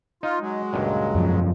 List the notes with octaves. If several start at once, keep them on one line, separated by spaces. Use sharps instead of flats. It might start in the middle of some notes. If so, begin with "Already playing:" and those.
D#4 F4
F#3 G#3
C#2 G2 A#2
F#2 F3